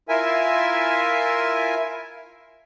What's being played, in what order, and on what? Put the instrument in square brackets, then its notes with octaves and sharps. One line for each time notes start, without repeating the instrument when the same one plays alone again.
[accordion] E4 F4 A#4 E5 G#5